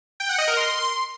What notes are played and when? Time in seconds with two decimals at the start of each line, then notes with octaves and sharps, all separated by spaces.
0.20 G5
0.29 F#5
0.38 D#5
0.48 A#4
0.57 C6